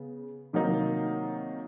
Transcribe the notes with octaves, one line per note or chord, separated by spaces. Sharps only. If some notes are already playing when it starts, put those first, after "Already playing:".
Already playing: C#3 B3
C3 D#3 F#3 A#3 D#4